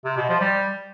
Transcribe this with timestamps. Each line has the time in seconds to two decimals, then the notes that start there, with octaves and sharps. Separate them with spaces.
0.05 C3
0.17 B2
0.29 F3
0.41 G3